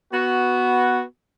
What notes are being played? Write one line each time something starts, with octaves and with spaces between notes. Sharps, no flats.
B3 F#4